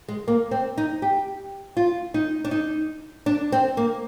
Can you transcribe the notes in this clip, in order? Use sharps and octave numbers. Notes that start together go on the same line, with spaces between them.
G#3
A#3
C4
D#4
G4
F4
D#4
D4
D#4
D4
C4
A#3